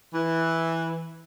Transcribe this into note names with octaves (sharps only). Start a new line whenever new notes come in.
E3